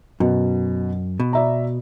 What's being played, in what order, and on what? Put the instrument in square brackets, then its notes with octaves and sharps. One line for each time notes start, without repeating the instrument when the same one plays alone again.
[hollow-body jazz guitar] F#2 [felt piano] B2
[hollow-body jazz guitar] B2
[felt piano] D5 E5 A#5